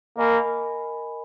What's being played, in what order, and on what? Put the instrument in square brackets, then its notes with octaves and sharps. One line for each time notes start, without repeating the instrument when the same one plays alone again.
[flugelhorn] A#3 [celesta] A#4 D#5 G#5 B5